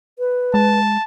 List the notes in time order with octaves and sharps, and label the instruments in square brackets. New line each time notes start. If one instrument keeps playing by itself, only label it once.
[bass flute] B4
[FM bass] G#3 [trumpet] A5